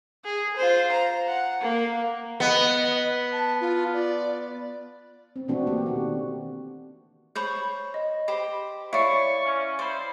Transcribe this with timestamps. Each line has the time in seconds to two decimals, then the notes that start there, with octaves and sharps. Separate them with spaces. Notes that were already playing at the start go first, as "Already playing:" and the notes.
0.24 G#4
0.56 F4 C5
0.92 A#5
1.27 F#5
1.61 A#3
2.40 B3 D#5
3.32 A5
3.61 F4
3.93 D5
5.36 C4
5.48 B2 E3 A3 C4 D4 F#4
5.67 A3 A#3 C4 G4
5.86 D#3 F#4
7.36 C5 C#5 B5 C#6 G6
7.94 D#5
8.28 G4 C5 B5
8.93 E4 C#5 D5 F5 C#6
9.44 C#4
9.79 E4 C5 D5 B5 C6